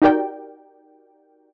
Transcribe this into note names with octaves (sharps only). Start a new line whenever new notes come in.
D#4 F#4 G4 A#4 D5 G5